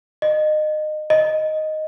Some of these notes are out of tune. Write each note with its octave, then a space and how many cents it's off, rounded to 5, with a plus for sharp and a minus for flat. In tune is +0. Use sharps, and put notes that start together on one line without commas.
D#5 -25
D#5 +0